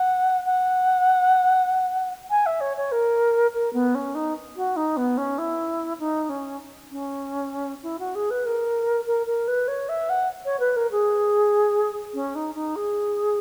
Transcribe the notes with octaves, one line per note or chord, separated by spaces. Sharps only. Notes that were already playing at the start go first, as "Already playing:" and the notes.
Already playing: F#5
F#5
G#5
E5
C#5
C#5
A#4
A#4
B3
C#4
D#4
F#4
D#4
B3
C#4
E4
D#4
C#4
C#4
E4
F#4
G#4
B4
A#4
A#4
A#4
B4
C#5
E5
F#5
C#5
B4
A#4
G#4
C#4
D#4
D#4
G#4